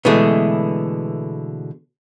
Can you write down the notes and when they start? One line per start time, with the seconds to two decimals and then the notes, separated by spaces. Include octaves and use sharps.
0.05 B2 D3 E3 G#3 A3